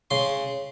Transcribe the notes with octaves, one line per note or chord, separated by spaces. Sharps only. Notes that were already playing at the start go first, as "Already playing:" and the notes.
C#3 C6